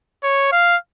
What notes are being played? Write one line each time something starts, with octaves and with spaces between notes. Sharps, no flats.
C#5
F5